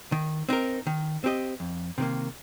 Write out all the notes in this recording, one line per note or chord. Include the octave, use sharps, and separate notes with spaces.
D#3
C4 D#4 A#4
D#3
C4 G4 D#5
F2
C3 D#3 A#3